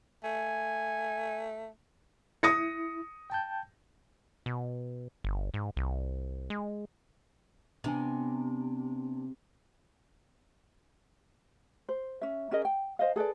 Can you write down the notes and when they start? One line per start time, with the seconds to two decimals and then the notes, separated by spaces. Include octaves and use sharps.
0.24 A3 G#5
2.43 E4 D#6 A#6 C#7
3.30 G5 A5 G6
4.46 B2
5.24 G1
5.54 G#2
5.77 C2
6.50 G#3
7.84 C3 B3 D4 G#5
11.89 C5
12.21 C#4 E5
12.51 C#4 G#4 A#4 D#5
12.65 G5
12.99 C5 D#5 F5
13.16 G#4 A4 B4 D5